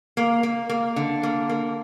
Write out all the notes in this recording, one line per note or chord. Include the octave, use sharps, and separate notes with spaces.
A#3
A#3
A#3
D3
A#3
A#3